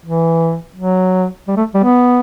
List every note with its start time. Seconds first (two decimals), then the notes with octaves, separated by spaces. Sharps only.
0.06 E3
0.76 F#3
1.48 G3
1.57 A3
1.74 G3
1.84 B3